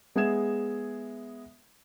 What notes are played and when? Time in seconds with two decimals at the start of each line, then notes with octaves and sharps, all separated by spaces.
0.16 G#3 B3 G#4 E5 G#6 E7